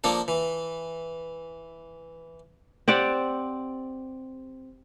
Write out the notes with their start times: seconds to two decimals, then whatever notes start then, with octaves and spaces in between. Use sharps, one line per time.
0.04 F3 A#3 D4 A4
0.28 E3
2.88 C4 G4 D5 F#5